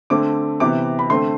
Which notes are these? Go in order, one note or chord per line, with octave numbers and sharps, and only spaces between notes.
D3 A3 C4 D6
C3 E3 B3 D6
B5
D3 A3 C4 C6